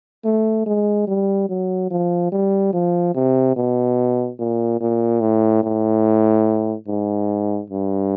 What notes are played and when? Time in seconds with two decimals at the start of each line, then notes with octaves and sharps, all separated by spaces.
0.25 A3
0.66 G#3
1.08 G3
1.49 F#3
1.91 F3
2.32 G3
2.73 F3
3.15 C3
3.56 B2
4.39 A#2
4.80 A#2
5.21 A2
5.63 A2
6.87 G#2
7.70 G2